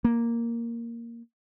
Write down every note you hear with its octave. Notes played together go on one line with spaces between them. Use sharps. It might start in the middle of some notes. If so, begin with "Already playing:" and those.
A#3